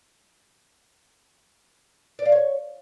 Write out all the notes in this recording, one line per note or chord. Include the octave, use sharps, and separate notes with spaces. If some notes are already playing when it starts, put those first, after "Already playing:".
D5
F5
C#5